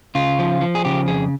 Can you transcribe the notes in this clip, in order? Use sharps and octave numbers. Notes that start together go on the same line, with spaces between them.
C#3 F4
F3
F3
G#4
C#3 G4
F2 G#4